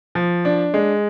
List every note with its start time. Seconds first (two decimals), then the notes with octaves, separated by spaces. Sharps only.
0.15 F3
0.45 D4
0.74 G#3